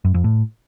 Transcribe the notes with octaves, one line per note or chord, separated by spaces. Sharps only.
F#2
F2
A2